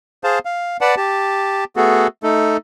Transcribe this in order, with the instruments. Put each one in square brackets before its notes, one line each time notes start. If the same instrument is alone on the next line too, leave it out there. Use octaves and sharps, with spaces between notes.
[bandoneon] G#4 C5 F5 A5
F5
B4 D5 F#5 A5
G4 A5
A3 B3 F#4 G#4 A4
A3 D#4 A4